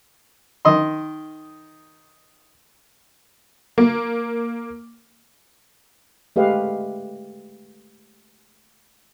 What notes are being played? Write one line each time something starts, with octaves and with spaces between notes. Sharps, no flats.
D#3 D#5 C6
A#3
G#3 A3 G4 B4 D#5 F5